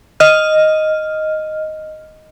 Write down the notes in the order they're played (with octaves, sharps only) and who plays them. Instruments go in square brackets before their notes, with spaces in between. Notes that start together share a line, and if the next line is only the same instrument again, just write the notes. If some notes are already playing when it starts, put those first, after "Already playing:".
[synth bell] D#5 F6